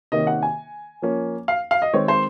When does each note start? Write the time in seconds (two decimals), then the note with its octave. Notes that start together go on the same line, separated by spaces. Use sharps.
0.12 C3 D#3 A#3 C#4 D#5
0.27 F#5
0.43 G#5
1.02 F3 A#3 C#4
1.48 F5
1.71 F5
1.82 D#5
1.93 D#3 G#3 C4 C#5
2.08 C5